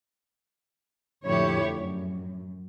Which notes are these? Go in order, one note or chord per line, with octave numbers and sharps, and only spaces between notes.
F2 A2 D3 E4 G4 C#5
F#2